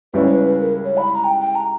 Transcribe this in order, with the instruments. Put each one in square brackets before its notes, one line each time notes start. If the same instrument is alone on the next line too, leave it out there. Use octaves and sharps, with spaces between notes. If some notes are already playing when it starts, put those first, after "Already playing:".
[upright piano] C#2 C#3 G3 C#4 E4 [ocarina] B4
[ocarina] C#5
B4
B4
A#4
C#5
B5
A#5
G5
G5
A#5